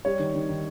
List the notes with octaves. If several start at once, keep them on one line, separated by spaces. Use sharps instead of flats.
G3 C#5
D#3
D#3
D#3